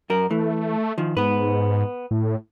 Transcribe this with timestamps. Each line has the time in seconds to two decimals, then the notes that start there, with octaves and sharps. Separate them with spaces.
0.10 F#2 A#4
0.31 E3 A3
0.98 D#3 F3
1.17 G#2 B3 B4
2.11 A2